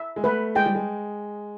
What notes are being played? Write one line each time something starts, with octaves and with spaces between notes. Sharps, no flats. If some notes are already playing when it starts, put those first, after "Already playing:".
Already playing: E5
G#3
A3 B4
G#3 G5
G3
G#3